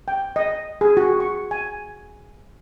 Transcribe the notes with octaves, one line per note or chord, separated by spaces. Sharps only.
G5
D#5
G#4
F#4
C#6
G#5